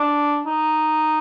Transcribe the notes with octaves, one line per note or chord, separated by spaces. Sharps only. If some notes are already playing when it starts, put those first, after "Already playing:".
Already playing: D4
D#4